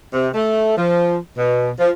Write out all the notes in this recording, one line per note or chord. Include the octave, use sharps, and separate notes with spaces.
C3
A3
F3
B2
F3